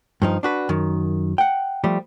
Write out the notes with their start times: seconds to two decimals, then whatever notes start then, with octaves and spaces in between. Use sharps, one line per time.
0.22 G2 F3 D#4
0.43 D4 F#4 B4
0.69 F#2 D#3
1.38 F#5 G5
1.84 F3 G3 A3